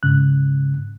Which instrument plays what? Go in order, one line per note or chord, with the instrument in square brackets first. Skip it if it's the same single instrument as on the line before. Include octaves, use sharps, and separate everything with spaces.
[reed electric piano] G#2 C#3 F#6